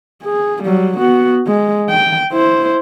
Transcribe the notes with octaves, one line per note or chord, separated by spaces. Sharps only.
G#4
F#3 G3
B3 F#4
G#3
G5
E4 C5